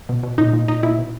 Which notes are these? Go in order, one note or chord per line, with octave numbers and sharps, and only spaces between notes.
B2
B2
A#2 D#4
A#2
A#2 D#4
A#2 E4
B2